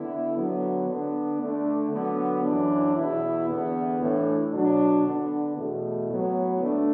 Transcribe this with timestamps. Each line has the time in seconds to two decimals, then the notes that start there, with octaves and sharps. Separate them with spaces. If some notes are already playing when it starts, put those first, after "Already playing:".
Already playing: D3 B3 E4
0.36 D3 F#3 B3
0.87 D3 B3 D4
1.40 D3 A3 D4
1.92 D3 F#3 B3
2.43 F#2 E3 D4
2.95 E2 B2 B3 E4
3.48 E2 D3 B3
4.00 A2 E3 A3 D4
4.52 B2 F#3 D4
5.03 D3 B3 D4
5.56 E2 B2 A3
6.08 A2 F#3 B3
6.60 D3 A3 D4